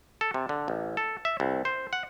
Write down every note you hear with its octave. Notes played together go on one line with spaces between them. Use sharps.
A4
C3
D3
A1
A4
E5
C2
C5
F#5